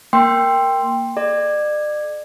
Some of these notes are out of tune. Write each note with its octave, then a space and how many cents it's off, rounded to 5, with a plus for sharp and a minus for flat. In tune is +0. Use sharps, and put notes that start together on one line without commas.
A#3 +0 G5 +10 C6 +0
A4 -35 D5 +40